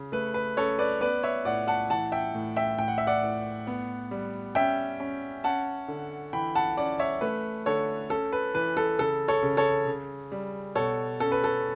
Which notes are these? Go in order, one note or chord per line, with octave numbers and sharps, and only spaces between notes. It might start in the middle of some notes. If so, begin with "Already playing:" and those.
Already playing: C#3
A3 B4
B4
C#4 A4 C#5
B4 D5
B3 B4 D5
C#5 E5
A2 D5 F#5
F#5 A5
E3 F#5 A5
E5 G5
A2
E5 G5
A2 G5
F#5
E5
D5 F#5
A2
B3
G3
C#4 E5 G5
C#4
C#4 F#5 A5
D3
E3 G5 B5
F#5 A5
C#4 D5 F#5
C#5 E5
A3 B4
D3 A4 C#5
C#4 A4
B4
E3 B4
A4
C#3 A4
A4 C#5
C#3
A4 C#5
C#3
G3
B2 A4 C#5
C#4 A4
B4
A4